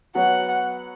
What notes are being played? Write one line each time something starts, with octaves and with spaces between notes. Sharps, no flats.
F#3 B3 F#4 C#5 F#5